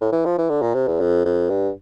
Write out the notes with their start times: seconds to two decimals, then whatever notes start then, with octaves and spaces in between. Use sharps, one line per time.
0.01 A2
0.12 E3
0.26 F3
0.38 E3
0.49 D3
0.62 A#2
0.74 C3
0.88 E2
1.00 F2
1.25 F2
1.50 G2